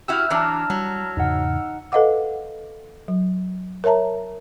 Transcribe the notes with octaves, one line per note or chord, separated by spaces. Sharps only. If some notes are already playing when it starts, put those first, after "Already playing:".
E4 F#4 G4 E6 F6
E3 F#3 D4 A5 A#5
F#3 G3
E2 G#2 C#3 D#4 F#5
A4 B4 D#5 F5 F#5 D6
F#3
A#4 C#5 E5 A5 A#5